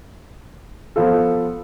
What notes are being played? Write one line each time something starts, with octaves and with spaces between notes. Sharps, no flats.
F3 B3 F4 A4